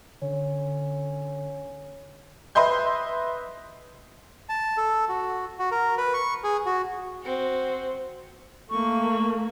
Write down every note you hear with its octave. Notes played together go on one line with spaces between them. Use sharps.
D3 C#4
B4 D#5 E5 C6 G6
A5
A4
F#4
F#4
A#4
B4
C#6
G#4
F#4
C4 F#4
A3 A#3 C#6